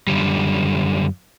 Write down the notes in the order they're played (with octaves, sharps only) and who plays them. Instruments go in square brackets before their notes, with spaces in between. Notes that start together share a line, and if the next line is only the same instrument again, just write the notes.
[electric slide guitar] F#2 D3 G3